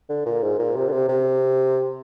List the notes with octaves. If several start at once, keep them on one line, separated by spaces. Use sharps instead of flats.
D3
A#2
G#2
A#2
C3
D3
C3
C3